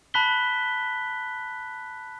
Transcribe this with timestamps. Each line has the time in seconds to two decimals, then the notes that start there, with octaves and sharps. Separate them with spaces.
0.14 A5 B5 F#6 B6 G7